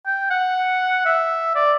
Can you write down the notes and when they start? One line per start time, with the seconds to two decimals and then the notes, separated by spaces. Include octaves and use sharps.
0.06 G5
0.30 F#5
1.06 E5
1.55 D5